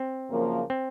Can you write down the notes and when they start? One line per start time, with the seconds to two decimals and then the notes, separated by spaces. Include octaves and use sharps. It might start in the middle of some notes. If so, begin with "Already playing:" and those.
Already playing: C4
0.30 F#2 C#3 F3 A#3
0.70 C4